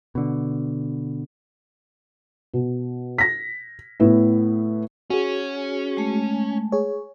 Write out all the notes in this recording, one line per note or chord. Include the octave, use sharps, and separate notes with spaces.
B2 D3
B2
A#6 B6
A2 B3 E4
C#4 F#4 G#4
G#3 A3
G#4 C#5